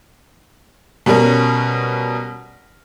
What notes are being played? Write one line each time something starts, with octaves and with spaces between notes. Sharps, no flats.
B2 G3 C#4 A#4